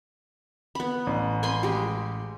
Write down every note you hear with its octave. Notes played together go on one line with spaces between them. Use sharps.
B3 B5
A1
G#5 B5 C6
G#3 G4